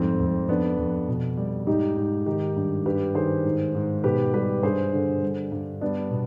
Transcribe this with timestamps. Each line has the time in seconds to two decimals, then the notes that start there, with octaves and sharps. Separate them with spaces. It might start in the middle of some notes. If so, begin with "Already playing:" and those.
Already playing: F2 G#2 G3 C4
0.20 F2
0.48 F2 B3 D4
0.78 F2
1.08 B2
1.37 G3
1.67 G#2 D#4 G4
1.97 G#2
2.26 D#3 D#4 G4
2.56 G2
2.86 G2 G4 B4
3.15 D#3 G#4 C5
3.45 G#2
3.75 G#2
4.04 B2 G4 B4
4.33 G3 G4 B4
4.63 G2 G#4 C5
4.93 D3
5.23 G3
5.52 G2
5.81 G3 B3 D4
6.11 B2